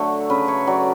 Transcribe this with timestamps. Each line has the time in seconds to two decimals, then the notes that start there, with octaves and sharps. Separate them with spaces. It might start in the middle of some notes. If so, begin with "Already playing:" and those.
Already playing: D3 F#3 A3
0.30 C#3 B4
0.48 C#5
0.67 F#3 D5